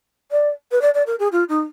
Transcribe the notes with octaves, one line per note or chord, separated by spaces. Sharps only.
D5
B4
D5
D5
A#4
G#4
F4
D#4